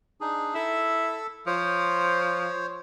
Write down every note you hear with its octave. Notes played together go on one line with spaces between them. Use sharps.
D4 D#4 G#4
E4 A4 E6
F3 C5 C#5